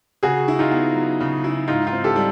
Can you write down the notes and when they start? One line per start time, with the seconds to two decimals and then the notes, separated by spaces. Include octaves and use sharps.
0.23 C#3 F#4 G#4
0.48 E4
0.59 D#4 F4
0.72 B3
0.95 F#3
1.20 C#3
1.44 E4
1.68 G#2 D#4 F4
1.86 D#4 F4
1.93 C4
2.04 G4 A4
2.16 G3